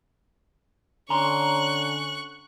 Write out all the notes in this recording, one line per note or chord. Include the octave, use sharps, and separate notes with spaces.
D3 C#4 A#5 C6 C#6 F#6